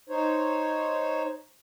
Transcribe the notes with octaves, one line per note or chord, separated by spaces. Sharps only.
D#4 C5 C#5